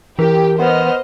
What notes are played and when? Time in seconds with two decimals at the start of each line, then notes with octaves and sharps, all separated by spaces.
0.19 E3 G4 A#4
0.59 B3 C5 D#5 F6